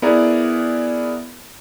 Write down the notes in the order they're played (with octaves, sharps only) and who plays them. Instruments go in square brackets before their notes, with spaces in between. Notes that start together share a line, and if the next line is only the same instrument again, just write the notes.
[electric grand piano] B3 E4 G#4 A#4 D5 A#5